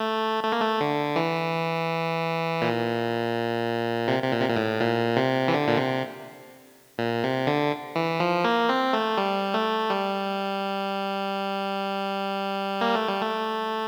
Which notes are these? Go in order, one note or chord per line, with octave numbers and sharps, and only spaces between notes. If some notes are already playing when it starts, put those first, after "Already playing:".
Already playing: A3
A3
A#3
A3
D3
E3
A#2
C3
C3
A#2
C3
A#2
A2
A#2
C3
E3
D3
A#2
C3
A#2
C3
D3
E3
F3
A#3
C4
A3
G3
A3
G3
A#3
A3
G3
A3